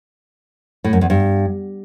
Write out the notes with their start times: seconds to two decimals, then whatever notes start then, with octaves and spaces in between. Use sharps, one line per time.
0.84 A2
0.93 F#2
1.01 E2
1.10 G2